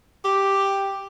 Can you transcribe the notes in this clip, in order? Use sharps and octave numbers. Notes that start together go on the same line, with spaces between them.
G4